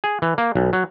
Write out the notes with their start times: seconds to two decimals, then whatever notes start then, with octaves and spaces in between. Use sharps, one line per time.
0.04 G#4
0.22 E3
0.38 A#3
0.55 B1
0.73 F#3